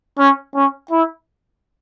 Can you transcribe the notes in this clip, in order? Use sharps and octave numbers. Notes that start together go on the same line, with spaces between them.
C#4
C#4
E4